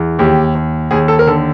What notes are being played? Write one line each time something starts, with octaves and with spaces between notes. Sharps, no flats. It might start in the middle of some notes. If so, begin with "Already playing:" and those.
Already playing: E2
D#2 G4
D#2
D#2 G#4
A4
A#4
D3 A4